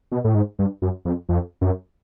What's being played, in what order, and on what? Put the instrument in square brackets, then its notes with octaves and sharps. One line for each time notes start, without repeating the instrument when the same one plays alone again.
[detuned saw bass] B2
A2
G#2
G2
F#2
F2
F2
F#2